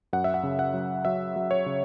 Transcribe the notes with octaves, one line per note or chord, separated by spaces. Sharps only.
F#2 F#5
E5
F#5
C#3
F#5
F#3
F#3 E5
F#3
C#5
C#3